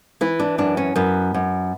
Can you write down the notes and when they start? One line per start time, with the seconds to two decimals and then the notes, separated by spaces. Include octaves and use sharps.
0.21 E3 E4
0.40 D4
0.58 F#2 D4
0.77 C#4
0.96 F#2 B3
1.34 F#2